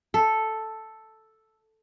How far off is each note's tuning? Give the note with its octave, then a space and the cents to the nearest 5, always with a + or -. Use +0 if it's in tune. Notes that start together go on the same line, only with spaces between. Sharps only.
A4 +0